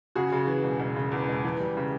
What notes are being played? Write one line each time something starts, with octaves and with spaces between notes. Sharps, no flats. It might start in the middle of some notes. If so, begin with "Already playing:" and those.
C#3 F#4 G#4
C#3
E3
E1
E1
C#3
E2
E1
E3
G3
C#3